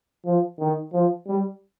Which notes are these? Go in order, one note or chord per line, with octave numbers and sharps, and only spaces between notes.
F3
D#3
F3
G3